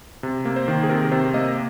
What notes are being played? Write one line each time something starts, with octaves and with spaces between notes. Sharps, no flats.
C3
A#3
C5
D#3
G#4
C3 A#4
C3 C5
A#3 D#5